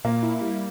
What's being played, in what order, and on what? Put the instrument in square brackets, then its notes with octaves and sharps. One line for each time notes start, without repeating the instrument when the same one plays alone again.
[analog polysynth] A#2 [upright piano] A#3
[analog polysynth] E4
G3